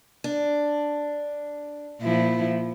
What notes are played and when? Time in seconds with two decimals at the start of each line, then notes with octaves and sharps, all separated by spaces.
0.24 D4
2.01 A#2 F3 E4